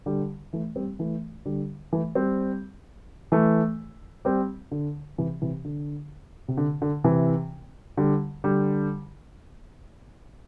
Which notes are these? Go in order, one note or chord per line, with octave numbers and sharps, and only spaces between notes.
D3 G3
E3 A3
G3 C4
E3 A3
D3 G3
E3 A3
G3 C4
E3 A3
G3 C4
D3
C3 E3
C3 E3
D3
C3
D3
D3
C3 E3
D3 G3
D3 G3